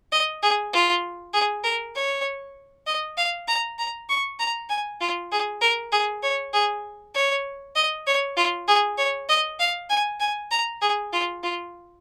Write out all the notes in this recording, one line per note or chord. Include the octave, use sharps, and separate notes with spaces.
D#5
G#4
F4
G#4
A#4
C#5
D#5
F5
A#5
A#5
C#6
A#5
G#5
F4
G#4
A#4
G#4
C#5
G#4
C#5
D#5
C#5
F4
G#4
C#5
D#5
F5
G#5
G#5
A#5
G#4
F4
F4